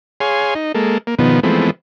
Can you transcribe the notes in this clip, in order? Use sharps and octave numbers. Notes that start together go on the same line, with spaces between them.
G#4 C#5 F5 G#5 C6
D#4
G#3 A#3 A4
A#3
B2 D#3 F3 B3
E3 F3 G#3 A3 B3 C4